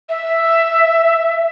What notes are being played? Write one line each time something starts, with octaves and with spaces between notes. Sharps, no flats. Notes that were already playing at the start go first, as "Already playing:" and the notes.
E5